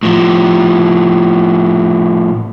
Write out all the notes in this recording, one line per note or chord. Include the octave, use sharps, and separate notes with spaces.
A2 F3